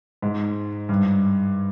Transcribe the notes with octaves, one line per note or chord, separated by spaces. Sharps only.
G#2
G2